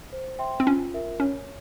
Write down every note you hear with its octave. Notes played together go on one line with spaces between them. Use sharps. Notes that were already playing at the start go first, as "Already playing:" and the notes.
C5
E5 G5 C6
C4
C#4 F4
A#4 E5
C#4 C#5